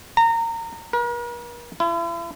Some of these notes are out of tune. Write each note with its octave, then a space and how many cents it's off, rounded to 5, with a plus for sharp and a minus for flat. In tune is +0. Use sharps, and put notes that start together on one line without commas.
A#5 -25
A#4 +45
E4 +45